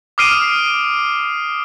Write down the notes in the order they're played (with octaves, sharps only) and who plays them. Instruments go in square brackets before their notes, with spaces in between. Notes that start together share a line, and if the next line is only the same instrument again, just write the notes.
[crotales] D6 D#6 F6 C7 D7 D#7